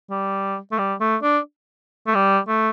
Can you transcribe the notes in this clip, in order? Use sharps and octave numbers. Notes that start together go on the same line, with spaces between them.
G3
A3
G3
A3
D4
A3
G3
A3